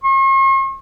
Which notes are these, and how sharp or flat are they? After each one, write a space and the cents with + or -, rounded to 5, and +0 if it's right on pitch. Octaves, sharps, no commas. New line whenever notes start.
C#6 -45